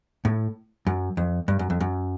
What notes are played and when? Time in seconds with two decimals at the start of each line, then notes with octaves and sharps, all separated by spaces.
0.25 A2
0.87 F#2
1.17 F2
1.48 G2
1.59 F#2
1.70 F2
1.80 F#2